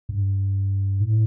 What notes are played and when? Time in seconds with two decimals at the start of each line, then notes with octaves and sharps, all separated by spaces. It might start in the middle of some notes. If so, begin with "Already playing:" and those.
0.09 G2
1.00 A2